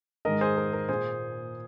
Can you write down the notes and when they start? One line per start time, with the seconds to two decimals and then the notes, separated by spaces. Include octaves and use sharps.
0.25 G#2 D#3 G#3 A#4 D#5
0.41 G#4 C5
0.57 A#4
0.73 A#4
0.89 A#2 A#3 G#4 C5